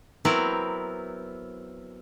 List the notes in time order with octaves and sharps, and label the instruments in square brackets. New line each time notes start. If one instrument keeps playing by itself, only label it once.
[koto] F#3 B3 C4 E4 A#4